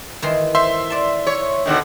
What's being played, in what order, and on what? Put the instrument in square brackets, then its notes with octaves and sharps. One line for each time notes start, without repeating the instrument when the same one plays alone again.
[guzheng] D#3 E3 C6
[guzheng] C5 [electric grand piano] E5 C6
[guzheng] D5 A5
[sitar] C#5
B2 D3 D#3